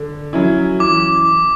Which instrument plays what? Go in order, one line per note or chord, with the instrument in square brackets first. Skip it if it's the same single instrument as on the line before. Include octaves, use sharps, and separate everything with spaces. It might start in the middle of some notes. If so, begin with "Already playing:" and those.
Already playing: [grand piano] D3
F#3 C#4 E4
[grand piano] E3 [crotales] D6